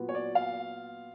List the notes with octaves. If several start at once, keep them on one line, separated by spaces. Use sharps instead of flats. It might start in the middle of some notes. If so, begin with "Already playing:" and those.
Already playing: A#2 F#3 B3
C#5
D5
F5